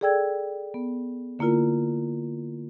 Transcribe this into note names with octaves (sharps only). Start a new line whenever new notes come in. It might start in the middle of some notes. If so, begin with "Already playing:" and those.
G#4 A4 D5 G5 E6 G#6
B3
D3 A#3 E4 F4 A#4